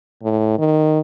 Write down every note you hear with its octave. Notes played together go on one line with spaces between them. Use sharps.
A2
D#3